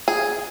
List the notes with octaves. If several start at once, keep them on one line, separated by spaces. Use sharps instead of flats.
G#4